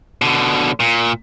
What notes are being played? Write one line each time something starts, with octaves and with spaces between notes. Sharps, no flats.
B2 D3
A#2